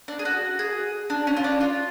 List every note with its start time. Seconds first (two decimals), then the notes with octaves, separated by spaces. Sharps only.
0.08 D4
0.19 G#4
0.25 F#4
0.59 G#4
1.10 D4
1.27 C#4
1.37 F4
1.44 D4
1.61 F4